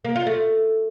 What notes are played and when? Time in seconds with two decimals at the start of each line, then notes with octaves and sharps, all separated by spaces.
0.05 A#3
0.16 F4
0.27 A3